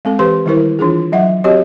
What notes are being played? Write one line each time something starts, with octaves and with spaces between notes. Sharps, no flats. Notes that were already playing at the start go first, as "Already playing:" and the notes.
G#3 C4 A4
E3 G4 B4 C5 C6
D#3 G3 E4 A#4 C5
E3 D4 F4 G#4
F#3 E5 F#5
C4 F#4 G4 C#5 D#5